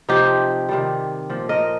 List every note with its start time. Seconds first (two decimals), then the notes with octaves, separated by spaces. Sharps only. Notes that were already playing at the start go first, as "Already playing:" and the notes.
0.09 C3 F3 D#4 G4
0.69 C3 D#3 G3
1.29 A#2 F3
1.49 A#4 D#5